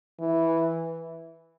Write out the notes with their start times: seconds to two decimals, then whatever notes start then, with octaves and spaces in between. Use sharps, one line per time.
0.20 E3